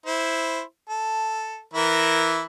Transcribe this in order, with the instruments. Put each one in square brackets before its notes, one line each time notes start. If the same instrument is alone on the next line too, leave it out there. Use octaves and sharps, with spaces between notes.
[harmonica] E4 C5
A4
E3 E4 A#4